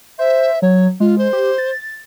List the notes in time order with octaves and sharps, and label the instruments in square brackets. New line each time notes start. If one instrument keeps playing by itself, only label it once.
[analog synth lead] C5 [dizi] E5
[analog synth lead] F#3 [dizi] C#5
[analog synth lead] G#3 [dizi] F4
[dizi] C5
[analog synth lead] G4
A6